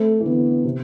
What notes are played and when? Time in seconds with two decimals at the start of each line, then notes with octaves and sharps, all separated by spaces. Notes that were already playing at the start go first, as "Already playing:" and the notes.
Already playing: A3 C4
0.20 E3
0.25 D3 B3
0.64 C3